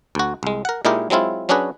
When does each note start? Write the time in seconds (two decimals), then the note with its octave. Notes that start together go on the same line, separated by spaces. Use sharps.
0.15 D2 F#4
0.43 C2 G#3
0.65 A#4 F#5
0.85 A#2 G#3 D#4 E4 G4 A#4
1.10 F#3 G#3 C4 E4 F4
1.49 F#3 C#4 D4 F#4 G#4 B4